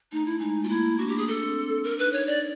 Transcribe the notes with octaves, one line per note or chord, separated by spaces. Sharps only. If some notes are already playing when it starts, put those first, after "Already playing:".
A3 D#4
E4
G#3 D#4
A#3 F4
A3 E4
D4 F#4
G4
G#4
D4 A4
C4
D4 A#4
D#4 B4
C#5
D5